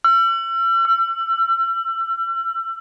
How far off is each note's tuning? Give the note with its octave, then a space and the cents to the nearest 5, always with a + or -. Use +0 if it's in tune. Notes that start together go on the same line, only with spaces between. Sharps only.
E6 +40
E6 +30